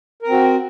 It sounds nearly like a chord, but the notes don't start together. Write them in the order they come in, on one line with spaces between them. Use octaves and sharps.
A#4 C4 F#4